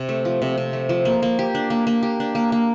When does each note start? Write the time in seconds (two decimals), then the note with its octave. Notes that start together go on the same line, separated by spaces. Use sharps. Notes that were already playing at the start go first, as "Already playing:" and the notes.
Already playing: C3
0.09 A3
0.25 F3
0.42 C3
0.58 C3
0.73 A3
0.89 F3
1.05 A#3
1.22 A#3
1.39 G4
1.55 D4
1.70 A#3
1.87 A#3
2.03 G4
2.20 D4
2.35 A#3
2.52 A#3